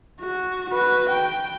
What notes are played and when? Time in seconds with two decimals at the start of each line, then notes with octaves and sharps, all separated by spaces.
0.21 F#4
0.70 F#4 B4
1.09 G5